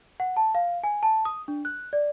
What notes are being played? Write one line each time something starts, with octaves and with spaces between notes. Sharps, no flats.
F#5
A5
F5
G#5
A5
D#6
D4
F#6
D5